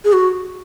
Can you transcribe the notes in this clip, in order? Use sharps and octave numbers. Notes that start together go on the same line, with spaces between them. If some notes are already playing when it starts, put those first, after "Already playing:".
G#4
F#4